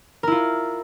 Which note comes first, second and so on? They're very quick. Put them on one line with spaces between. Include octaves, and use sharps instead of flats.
A#4 E4 F4